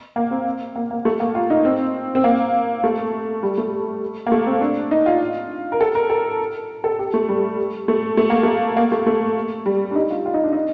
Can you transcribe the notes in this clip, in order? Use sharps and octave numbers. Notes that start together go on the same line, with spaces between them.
A#3
C4
A#3
A#3
A3
A#3
F4
D#4
C4
C4
A#3
A3
G3
A3
A#3
A3
C4
D4
D#4
F4
A#4
A4
A#4
A4
A4
G4
A3
G3
A3
A3
A#3
A3
A#3
A3
A3
G3
D4
D#4
F4
F4
D#4
D4
D#4